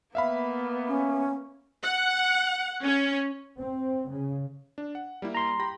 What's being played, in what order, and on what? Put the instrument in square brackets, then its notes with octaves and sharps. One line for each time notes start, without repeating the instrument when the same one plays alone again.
[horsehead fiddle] A#3 B3 [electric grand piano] E5 F5 B5
[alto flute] C#4
[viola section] F#5
C#4
[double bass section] C4
C#3
[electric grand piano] D4
F#5
G3 A#3 E4
[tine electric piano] A#5 C6
[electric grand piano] G4 B5 A#6